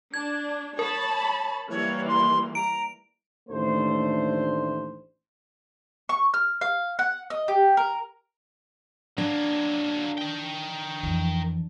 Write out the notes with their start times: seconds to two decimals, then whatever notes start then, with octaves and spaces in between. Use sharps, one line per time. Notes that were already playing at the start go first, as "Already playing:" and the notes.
0.14 D4 G#6
0.79 A#4 C#5 A5 B5
1.70 E3 G3 A#3 C#5
2.08 C6
2.55 A#5 D7
3.50 A1 D#2 A3 D4 C5
6.09 C#6
6.34 F6
6.61 F5
6.99 F#5
7.30 D#5
7.48 G4
7.77 A#4
9.18 F#3 A#3 D4
10.18 A#4 G5
11.03 F2 E3